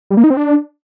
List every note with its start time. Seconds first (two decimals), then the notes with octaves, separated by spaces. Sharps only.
0.11 G3
0.17 A#3
0.24 D#4
0.30 C4
0.37 D4